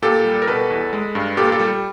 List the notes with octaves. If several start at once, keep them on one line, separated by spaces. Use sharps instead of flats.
A#2 G4 A4
G3
A#4
B2 A4 B4
E2
G#3
G2
A#2 G4 A4
G4 A4
G3